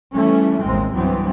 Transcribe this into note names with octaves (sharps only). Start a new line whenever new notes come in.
E3 G3 A3 C#4
A1 D#2 G#3 C4
C2 G2 E3 F#3 B3 C4